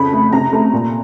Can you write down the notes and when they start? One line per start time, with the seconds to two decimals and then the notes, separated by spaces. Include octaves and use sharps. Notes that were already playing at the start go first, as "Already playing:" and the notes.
Already playing: F2 C#3 B5
0.13 A3
0.33 C3 A#5
0.53 A3
0.73 A#2